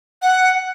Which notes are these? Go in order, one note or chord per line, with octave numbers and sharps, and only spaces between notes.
F#5